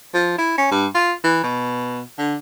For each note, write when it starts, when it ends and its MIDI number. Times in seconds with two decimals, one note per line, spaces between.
0.14 0.34 53
0.38 0.57 64
0.58 0.66 61
0.71 0.86 43
0.95 1.12 65
1.24 1.43 52
1.43 2.01 47
2.18 2.35 50